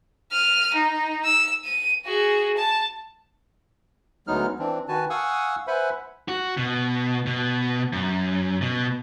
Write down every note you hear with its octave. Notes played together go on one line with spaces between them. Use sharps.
F6 D#7
D#4
E6
D#7
F#4 G#4
A5
D2 F#3 G#3 B3 D#4 F6
E3 C4 D4
D#3 F#4 B4 G#5 A5
F5 F#5 G#5 C#6 D#6 E6
B4 C5 E5 F#5 G#5 B5
F#4
B2
B2
F#2
B2